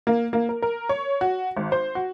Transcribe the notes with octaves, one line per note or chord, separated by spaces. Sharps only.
A#3
A#3
A#4
A#4
C#5
F#4
G#1
C5
F#4